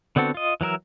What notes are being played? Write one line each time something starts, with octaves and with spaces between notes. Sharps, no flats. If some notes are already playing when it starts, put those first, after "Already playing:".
D3 B3 C4 F#4 A4
F4 D#5
E3 F#3 A#4 E5